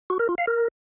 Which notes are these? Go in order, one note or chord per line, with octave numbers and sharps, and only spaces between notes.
F#4
A#4
F4
F5
A#4